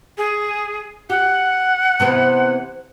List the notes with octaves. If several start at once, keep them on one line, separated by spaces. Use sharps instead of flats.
G#4
G4 F#5
C3 E3 B3